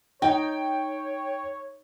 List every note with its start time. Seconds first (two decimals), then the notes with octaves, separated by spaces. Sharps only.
0.22 D#4 C#5 G5